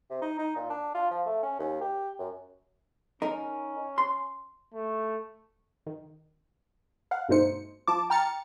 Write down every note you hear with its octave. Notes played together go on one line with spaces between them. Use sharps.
C3
D#4
D#4
A#2
D4
F4
F3
A3
C#4
D#2
G4
F#2
C#4 D#4 A#4
C6
A3
D#3
F5 F#5
G2 B2 A3 D#4 C5 C#7
F3 A5 D6
G5 A#5 F6 A6 C#7